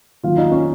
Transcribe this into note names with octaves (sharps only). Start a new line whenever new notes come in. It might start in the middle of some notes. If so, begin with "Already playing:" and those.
D#3 F#3 A#3 F4 F5
D#4 D#5
C#4 C#5